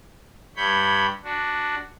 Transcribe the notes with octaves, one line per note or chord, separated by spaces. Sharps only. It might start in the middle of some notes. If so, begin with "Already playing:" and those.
G2 C#5 B5 G6
D4 F#4